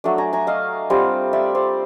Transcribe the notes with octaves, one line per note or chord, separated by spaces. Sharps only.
F#3 A3 D4
G#5 A#5
G#5 A#5
D#5 F5
G3 C4 F4
D5 E5
C5 D5